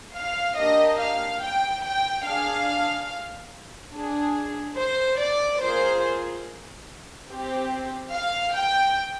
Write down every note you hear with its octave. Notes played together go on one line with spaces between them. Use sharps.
F5
A#3 D4 G4 D#5
F5
G5
G5
D4 G#4 F5
D4 G#4
C5
D5
A#3 F4 G#4 C5
C4 G4
F5
G5